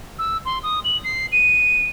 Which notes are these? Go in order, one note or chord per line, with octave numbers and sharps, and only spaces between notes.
E6
C6
D#6
F#7
C7
D#7